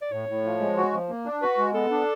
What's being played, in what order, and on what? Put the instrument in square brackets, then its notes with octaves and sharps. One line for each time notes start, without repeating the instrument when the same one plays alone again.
[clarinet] D5
[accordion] A2 [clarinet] C#5
[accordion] A2
F3
G#3
F#4
F3
A#3
D4
[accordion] F#4 [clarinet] B4
[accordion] G#3
[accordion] B3 [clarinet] A4
[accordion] D4